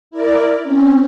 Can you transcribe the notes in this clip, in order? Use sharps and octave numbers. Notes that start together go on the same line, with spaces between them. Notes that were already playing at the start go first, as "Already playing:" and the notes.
E4 A#4 D5
C4 C#4